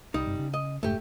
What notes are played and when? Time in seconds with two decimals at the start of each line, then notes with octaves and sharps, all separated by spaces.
0.14 C2 G3 D#4
0.26 F#1 G2 C3
0.39 C#3
0.54 D#5
0.83 F1 G#2 A3 G4